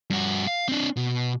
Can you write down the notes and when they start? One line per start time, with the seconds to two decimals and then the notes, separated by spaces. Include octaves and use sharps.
0.10 G2 F#4
0.47 F5
0.68 C4 D4
0.97 B2